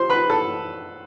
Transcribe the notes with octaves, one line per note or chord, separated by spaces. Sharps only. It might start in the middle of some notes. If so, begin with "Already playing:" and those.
Already playing: C5 C6
B4 B5
A4 A5